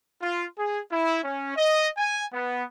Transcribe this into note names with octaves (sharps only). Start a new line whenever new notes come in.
F4
G#4
E4
C#4
D#5
G#5
B3